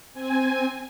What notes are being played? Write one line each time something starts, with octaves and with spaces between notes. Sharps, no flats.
C4 G#5